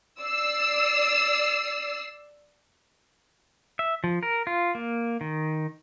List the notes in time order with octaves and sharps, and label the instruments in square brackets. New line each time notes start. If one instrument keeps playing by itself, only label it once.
[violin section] D5 E6 C7
[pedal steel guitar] E5
F3
A#4
F4
A#3
D#3